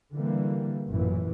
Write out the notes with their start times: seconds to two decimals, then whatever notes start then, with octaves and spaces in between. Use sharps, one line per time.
0.13 D3 E3 G3 A#3
0.87 A1 F#2 A#2 E3